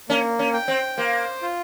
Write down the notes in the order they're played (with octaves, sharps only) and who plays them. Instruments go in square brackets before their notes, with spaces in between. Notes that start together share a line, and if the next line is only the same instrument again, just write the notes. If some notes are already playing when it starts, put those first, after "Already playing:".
[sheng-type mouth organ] A#3 [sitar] C#4
[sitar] C#4
[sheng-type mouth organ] G5
[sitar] C4
[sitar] A#3 [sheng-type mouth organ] C5
[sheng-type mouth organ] F4